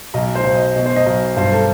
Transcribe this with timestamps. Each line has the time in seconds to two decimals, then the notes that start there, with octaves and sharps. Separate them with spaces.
0.14 B1 D#5
0.35 C5
0.44 B1
0.55 D#5
0.75 B2 D#5
0.86 C5
0.96 D#5
1.06 B1
1.36 G2 C5
1.52 A4